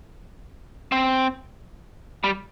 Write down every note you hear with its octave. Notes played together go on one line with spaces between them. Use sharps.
C4
G3